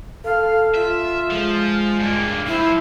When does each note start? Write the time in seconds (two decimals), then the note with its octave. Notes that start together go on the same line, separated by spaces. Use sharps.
0.25 A4 F5
0.75 F4 E5
1.30 F3 G#3
2.00 G2 A#3
2.47 F3 E4 C5